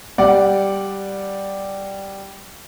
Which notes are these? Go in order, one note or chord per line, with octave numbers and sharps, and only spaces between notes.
G3 D5 F#5